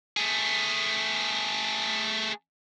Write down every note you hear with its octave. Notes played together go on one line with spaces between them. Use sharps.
A3 G#4